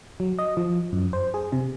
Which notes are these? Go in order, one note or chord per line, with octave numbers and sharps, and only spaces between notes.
F#3
D#5
F3
F#2
C5
G#4
C3